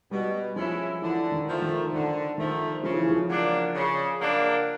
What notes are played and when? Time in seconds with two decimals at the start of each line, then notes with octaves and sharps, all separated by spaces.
0.11 B2 G3
0.56 F3 G#3 C#4 E4
1.02 D3 E3
1.32 D#3
1.48 F3 A3
1.62 D#3
1.93 D3 D#3
2.38 D#3 F3 A3
2.83 C#3 F3
2.96 E3
3.10 F3
3.29 F#3 A#3 D4
3.74 C#3
4.20 F#3 A#3 D4